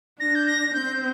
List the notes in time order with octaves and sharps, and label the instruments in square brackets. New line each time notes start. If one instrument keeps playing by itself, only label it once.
[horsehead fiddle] D4 [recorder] A#6
[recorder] G6
A#6
[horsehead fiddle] C4 [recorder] G6